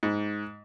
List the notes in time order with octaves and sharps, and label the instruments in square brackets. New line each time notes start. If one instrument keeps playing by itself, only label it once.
[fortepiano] G#2